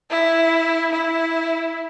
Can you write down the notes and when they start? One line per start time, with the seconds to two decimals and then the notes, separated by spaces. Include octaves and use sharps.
0.10 E4
0.92 E4